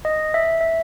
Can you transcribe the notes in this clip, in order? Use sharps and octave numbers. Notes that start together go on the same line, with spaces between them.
D#5
E5
E5